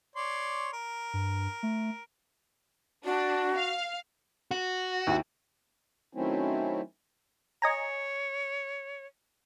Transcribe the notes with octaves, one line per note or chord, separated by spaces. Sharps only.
C#5 D5 C6
A#4
G2
A3
D4 F#4
F5
F#4
D#2 E4
D#3 F#3 A3 C4 C#4 E4
C#5 D#5 G#5 A#5